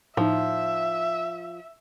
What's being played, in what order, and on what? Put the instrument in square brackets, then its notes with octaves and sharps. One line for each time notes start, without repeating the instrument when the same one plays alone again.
[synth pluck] A2 D#4 [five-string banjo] F3 [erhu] E5